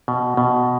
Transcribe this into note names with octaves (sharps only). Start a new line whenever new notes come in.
B2
B2